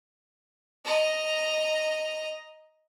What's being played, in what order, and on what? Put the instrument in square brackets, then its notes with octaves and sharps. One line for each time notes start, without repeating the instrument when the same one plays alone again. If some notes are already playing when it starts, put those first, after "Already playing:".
[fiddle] D#5 A#5